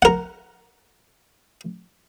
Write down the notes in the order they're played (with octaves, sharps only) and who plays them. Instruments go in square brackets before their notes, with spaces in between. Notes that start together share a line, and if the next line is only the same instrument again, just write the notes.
[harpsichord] A#4 F#5